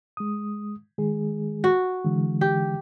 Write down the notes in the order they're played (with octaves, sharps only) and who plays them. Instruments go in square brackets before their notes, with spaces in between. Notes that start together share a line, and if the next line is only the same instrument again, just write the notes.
[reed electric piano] G#3 D#6
D#3 G#3 G#4
[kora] F#4
[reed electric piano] D3 E3 G#3
[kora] G4